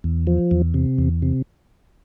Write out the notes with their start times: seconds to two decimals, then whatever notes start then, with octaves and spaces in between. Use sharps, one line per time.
0.04 E2
0.27 F3
0.51 E2
0.74 C3
0.98 E2
1.22 C3